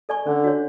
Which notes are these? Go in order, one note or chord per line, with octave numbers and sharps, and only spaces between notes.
A4 D5 G#5 C#6
D3 C#4
F#4 C#5